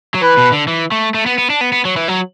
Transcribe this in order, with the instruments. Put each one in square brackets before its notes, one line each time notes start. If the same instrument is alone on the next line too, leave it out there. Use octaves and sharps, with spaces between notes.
[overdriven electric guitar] F#3
[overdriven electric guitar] E3 [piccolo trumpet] B4
[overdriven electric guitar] B2
D3
E3
A3
A3
B3
B3
D4
B3
B3
F#3
E3
F#3